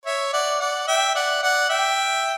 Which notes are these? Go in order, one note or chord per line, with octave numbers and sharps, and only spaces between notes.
C#5 E5
D5 F#5
D5 F#5
E5 G5
D5 F#5
D5 F#5
E5 G5